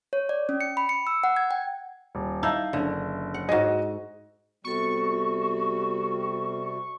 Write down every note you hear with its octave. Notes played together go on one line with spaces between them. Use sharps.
C#5
D5
C#4
C#7
B5
C#7
E6
F#5
G#6
G5
D#1
D#4 E4 F5 A5 E6
F#1 D3
F#5
G#2 F#4 G#4 D#5
C3 G3 B3 F#4 A4 C#6